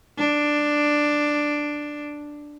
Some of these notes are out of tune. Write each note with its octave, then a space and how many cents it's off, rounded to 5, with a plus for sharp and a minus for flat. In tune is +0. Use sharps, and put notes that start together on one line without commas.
D4 +5